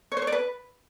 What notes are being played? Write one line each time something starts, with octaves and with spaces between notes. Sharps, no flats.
C#5
C5
C#5
D5
B4